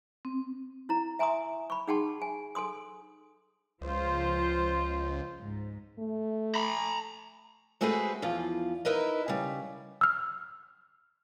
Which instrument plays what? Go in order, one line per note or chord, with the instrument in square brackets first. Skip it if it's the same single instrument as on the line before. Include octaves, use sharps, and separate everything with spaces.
[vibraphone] C4
[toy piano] E4 A#5
E5 G#5 A#5 C6 C#6 D#6
B5 C#6
D#4 G#4 F#5 G5 A5 C6
G#5
A4 G#5 C6 D#6
[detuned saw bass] C#2 [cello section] F3 F4 C5
[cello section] G#2
[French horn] A3
[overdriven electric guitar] A#5 B5
[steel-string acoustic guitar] G#3 A3 C4 F#4 G#4 B4
E2 F3 F4
D#4 E4 A#4 B4 D#5
C#3 G3
[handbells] E6 F6